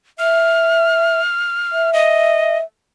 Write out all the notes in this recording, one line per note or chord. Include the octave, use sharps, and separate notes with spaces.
E5 F6
E5
D#5